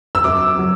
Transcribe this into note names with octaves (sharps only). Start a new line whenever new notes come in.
E6
F#2 D6
F#3